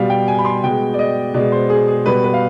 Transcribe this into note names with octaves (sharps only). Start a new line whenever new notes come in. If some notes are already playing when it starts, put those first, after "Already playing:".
Already playing: B2 G3 F5
G5
G#5
B5
C6
B2 G#3 G5
D5
D#5
B2 G#3 D5
C5
G#4
G#4
B2 G3 B4
B4
F5